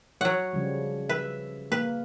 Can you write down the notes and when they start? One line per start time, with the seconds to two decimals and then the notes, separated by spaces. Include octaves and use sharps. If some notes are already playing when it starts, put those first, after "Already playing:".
0.21 F#3 C#5 F#5
0.53 C#3 F3 G3
1.09 B4 E5
1.72 A#3 B4